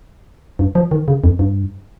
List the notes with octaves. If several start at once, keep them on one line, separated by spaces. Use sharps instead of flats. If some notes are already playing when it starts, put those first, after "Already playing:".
G2
F3
D#3
C#3
F2
G2